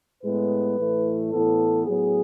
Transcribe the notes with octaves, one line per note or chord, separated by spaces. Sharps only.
A2 G#3 B3 B4
A2 E3 A3
A2 E3 B3 A4
A2 F#3 B3 G#4